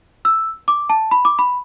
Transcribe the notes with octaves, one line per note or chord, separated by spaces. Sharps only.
E6
D6
A5
B5
D6
B5